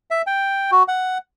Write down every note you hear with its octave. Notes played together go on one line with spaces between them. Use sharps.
E5
G5
F#4
F#5